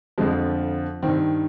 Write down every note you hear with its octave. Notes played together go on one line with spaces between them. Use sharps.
F2 D3 F3 G#3
G2 D#3 C4